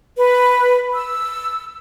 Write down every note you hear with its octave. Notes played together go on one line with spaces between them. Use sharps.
B4
E6